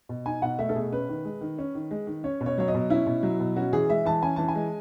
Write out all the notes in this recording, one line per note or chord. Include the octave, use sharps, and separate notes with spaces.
B2
D#4 G#5
B2 F#5
A3 E5
A4
B2 G#4
C#4 B4
D#3
G#3
D#3
C#4
D#3
G#3
D#3
C#4 C#5
B2
C#5
F#3 C#5
D#5
B2
C#4 E4
B2
F#3
B2
C#4 F#4
E3 G#4
G#3 E5
E3 A5
C#4 G#5
E3 A5
G#5
G#3